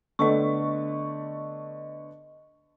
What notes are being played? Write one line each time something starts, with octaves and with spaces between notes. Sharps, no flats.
D3 A3 B3 D#5 C#6